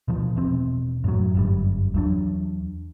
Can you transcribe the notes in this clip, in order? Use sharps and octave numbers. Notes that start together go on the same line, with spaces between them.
B2 F3
E1 B2 C4
F#2 A2 F#3
G1 F#2 G3
E2 F#3 D4